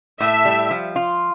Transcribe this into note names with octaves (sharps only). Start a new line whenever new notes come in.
A2 E5
G3
F3
F4